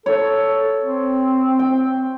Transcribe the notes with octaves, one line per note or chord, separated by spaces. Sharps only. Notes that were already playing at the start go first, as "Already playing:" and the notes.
A4 C#5
C4
G5